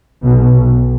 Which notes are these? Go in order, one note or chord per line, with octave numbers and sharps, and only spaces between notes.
B1 B2